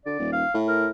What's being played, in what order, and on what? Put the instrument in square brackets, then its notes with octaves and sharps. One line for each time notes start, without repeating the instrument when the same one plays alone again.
[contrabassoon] D3 [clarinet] D5
[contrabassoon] D#1
[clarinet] F5
[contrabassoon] A2
[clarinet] A#4